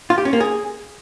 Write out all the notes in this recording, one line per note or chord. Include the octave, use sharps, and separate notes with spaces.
F4
G4
C#4
A#3
G#4